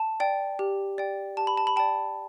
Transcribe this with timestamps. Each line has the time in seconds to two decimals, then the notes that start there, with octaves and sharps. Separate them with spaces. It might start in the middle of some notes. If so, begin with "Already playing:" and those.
Already playing: A5
0.20 D5 G5
0.59 G4
0.98 D5 G5
1.37 G4 A5
1.47 B5
1.57 A5
1.67 B5
1.76 D5 G5 A5